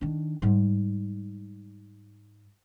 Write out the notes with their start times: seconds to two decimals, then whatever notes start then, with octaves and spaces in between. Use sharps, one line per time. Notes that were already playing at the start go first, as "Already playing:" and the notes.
0.01 D#3 D4
0.42 G#2 G3